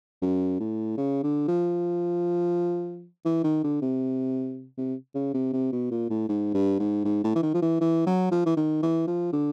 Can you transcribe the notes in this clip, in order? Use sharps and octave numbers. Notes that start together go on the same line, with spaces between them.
F#2
A2
C#3
D3
F3
E3
D#3
D3
C3
C3
C#3
C3
C3
B2
A#2
A2
G#2
G2
G#2
G#2
A2
E3
D#3
F3
E3
E3
F#3
F3
E3
D#3
E3
F3
D3